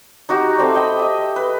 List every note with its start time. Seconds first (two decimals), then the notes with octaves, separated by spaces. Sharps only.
0.29 D#4 F#4 G4 A#5
0.58 A3 C4 D5
0.73 C5 D#5 G5 B5
0.99 D#5 E5
1.36 B4